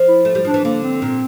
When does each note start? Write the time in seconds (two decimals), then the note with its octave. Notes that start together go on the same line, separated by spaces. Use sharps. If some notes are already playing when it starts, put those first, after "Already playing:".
Already playing: F3
0.09 E4
0.25 A3
0.35 G3
0.45 F3 D4
0.54 E3
0.64 D3 A#3
0.83 C4
1.02 A#2